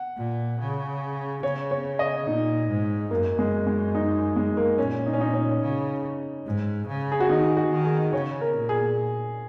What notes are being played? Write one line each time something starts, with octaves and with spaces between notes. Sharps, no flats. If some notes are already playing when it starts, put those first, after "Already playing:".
Already playing: F#5
A#2
C#3
C#3 C#5
C#5
D#5
A#2 D#4
G#2
F#2 A#3
G#3
G#3
D#4
G#3
A#3
A#2 C#4
D#4
C#4
D#4
C#4
C#3
G#2
C#3
G#4
F#4
D#3 D#4
F#4
D#3
G#4
C#3 C#5
A#4
A#2
G#4